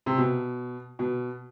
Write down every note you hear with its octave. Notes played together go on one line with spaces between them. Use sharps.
C3
B2
B2